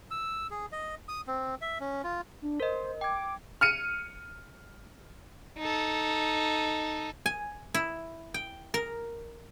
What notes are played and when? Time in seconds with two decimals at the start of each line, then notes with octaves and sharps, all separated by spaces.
0.11 E6
0.50 G#4
0.72 D#5
1.08 D#6
1.27 C4
1.61 E5
1.80 C#4
2.04 F4
2.42 D4
2.60 A#4 C5 D#5
3.01 G5 D6 G#6
3.61 F6 C#7 D#7
5.58 D#4 A4
7.26 G#5
7.74 E4
8.34 G5
8.74 A#4